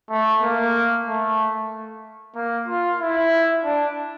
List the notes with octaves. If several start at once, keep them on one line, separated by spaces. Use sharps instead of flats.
A3
A#3
A3
A#3
F4
E4
D4